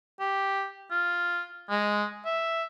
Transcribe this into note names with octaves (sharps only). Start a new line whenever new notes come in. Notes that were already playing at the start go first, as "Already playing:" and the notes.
G4
F4
G#3
E5